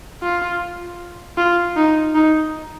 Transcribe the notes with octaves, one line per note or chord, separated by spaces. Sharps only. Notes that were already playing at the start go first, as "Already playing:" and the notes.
F4
F4
D#4
D#4